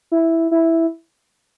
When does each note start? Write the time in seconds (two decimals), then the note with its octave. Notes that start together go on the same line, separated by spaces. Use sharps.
0.12 E4
0.51 E4